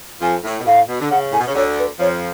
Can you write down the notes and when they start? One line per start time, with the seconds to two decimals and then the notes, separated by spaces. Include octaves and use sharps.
0.21 F2 F3 G#5
0.44 A2
0.60 B2
0.66 A2 F5
0.88 B2
1.01 D3
1.10 C#3 F#5
1.32 A2 G#5
1.39 B2
1.48 C#3
1.55 D2 D3 C#5
1.78 B4
1.99 F2 F3 C#5